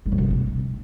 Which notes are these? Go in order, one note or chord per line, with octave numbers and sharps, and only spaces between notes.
G3
A#2
C3
B2
C4